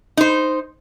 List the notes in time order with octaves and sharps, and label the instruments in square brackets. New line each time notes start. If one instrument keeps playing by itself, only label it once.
[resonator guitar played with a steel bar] D#4 C5